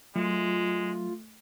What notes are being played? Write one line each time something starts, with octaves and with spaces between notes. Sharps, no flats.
F#3 G#3 A3 F4